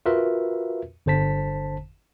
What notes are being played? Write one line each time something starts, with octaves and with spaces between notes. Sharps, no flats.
F4 F#4 A#4 B4 E5
G1 D3 C5 A5 B6